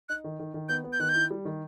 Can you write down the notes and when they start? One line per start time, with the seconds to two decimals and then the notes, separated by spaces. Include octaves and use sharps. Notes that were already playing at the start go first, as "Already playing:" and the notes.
0.09 D#4 F#6
0.24 D#3
0.39 D#3
0.54 D#3
0.69 B3 G6
0.84 B3
0.93 G6
1.00 D#3 F#6
1.09 G6
1.15 E4
1.31 G3
1.45 D#3